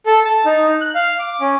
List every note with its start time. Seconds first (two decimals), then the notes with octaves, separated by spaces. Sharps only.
0.06 A4
0.25 A5
0.45 D#4
0.81 F#6
0.95 F5
1.19 D6
1.40 C#4